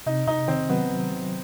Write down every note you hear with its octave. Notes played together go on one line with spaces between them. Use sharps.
C3 D#4
C3 D#4
D#3 C4
F#3 B3
F#3
F#3